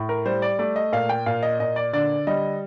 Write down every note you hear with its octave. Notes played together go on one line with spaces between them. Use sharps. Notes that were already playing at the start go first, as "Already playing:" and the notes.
Already playing: A2
A#4
G3 C5
D5
A3 D5
D#5
A#2 F5
G5
A#2 F5
D#5
A#2 D#5
D5
D3 D5
G3 D#5